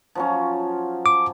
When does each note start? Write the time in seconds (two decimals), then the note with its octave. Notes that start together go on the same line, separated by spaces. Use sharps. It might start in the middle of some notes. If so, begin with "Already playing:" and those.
0.15 F3 F#3 C#4
1.06 D6